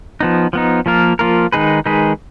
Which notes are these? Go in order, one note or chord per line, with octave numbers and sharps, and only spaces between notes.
F3 B3 D#4
F3 B3 D#4
F3 A#3 F4 A#4
F3 A#3 F4 A#4
D#3 G#3 D#4 G#4 B4
D#3 G#3 D#4 G#4 B4